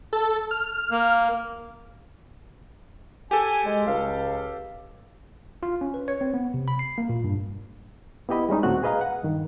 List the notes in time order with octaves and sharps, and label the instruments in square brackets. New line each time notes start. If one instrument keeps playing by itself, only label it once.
[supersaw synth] A4
F6
[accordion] A#3
[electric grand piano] G4 A4 [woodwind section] G#5
[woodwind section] G#3
C#2 F5
[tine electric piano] F4
C#4
B4
C#5
C4
B3
C3
B5
C7
A#3
A#2
G2
[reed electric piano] B3 E4 G4 D#5 B5
G3 G#3 C#4 D#4
D#2 A#2 A3 C4 F#4 F#6
G#4 B4 D#5 F5 A#5
F#5
G2 D#3